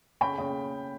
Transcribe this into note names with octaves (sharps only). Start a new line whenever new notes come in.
C#3 G5 B5
C#3